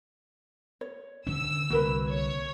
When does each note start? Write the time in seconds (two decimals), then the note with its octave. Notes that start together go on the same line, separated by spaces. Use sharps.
0.81 C#5
1.27 D3 C#4 E6
1.70 C2 D3 A#3 F#4 A#4 B4
2.08 C#5